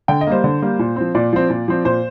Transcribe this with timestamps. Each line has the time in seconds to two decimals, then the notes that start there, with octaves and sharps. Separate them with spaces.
0.08 D3 G5
0.21 D#5
0.27 G3 A#3 C5
0.44 D3
0.62 G3 A#3
0.79 A#2
0.96 F3 C4
1.15 A#2 D5
1.33 F3 C4
1.50 A#2
1.68 F3 C4
1.85 A#2 C5